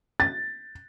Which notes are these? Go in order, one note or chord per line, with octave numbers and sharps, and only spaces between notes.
A6